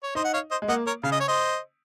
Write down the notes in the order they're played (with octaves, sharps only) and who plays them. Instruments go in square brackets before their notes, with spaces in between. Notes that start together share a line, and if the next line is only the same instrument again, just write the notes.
[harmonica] C#5
[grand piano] D#4 [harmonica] C5 D#5
[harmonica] F#5
C#5 F5
C5 D#5
[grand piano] G#3
[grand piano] A#3 [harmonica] D#5 F#5
[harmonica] A#4 C#5
[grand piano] C#3 [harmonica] F5
[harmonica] D#5
C#5
C5 D#5